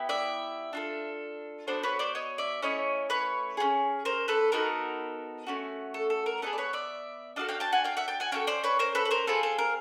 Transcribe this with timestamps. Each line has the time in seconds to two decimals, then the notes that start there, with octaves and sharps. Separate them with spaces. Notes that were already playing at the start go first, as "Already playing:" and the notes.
Already playing: B3 E4 G4
0.09 D5 E5
0.73 D4 F4 A4
1.67 B3 D4 F#4 A4 C5 D5
1.83 B4 C#5
1.99 C5 D5
2.15 C#5 D#5
2.38 D5 E5
2.62 A3 C#4 E4 C#5 D#5
3.10 B4 C#5
3.57 C#4 F4 G#4
4.05 A#4 C5
4.28 A4 B4
4.52 B3 D#4 F#4 A4 A#4
5.47 A3 C#4 F#4
5.94 A4
6.10 A4
6.26 A#4
6.42 B3 D#4 G#4 A4 B4
6.53 D5
6.58 B4 C#5
6.73 D5 E5
7.36 D4 F#4 A4 D#5 F5
7.49 F5 G5
7.60 G5 A5
7.72 F#5 G#5
7.84 F5 G5
7.97 E5 F#5
8.08 G5 A5
8.20 F#5 G#5
8.32 C#4 F#4 A4 F5 G5
8.47 C5 D5
8.64 B4 C#5
8.79 A#4 C5
8.95 A4 B4
9.05 B4
9.11 A#4 C5
9.27 C4 F4 G#4 A4 B4
9.43 A4
9.58 A#4